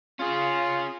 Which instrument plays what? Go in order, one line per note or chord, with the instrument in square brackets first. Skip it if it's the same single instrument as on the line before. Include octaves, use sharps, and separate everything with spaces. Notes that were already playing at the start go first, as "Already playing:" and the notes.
[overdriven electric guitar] C#4 G#4 [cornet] F4